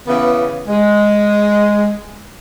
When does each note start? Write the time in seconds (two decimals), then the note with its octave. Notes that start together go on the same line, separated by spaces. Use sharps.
0.07 C#3 E3 B3
0.68 G#3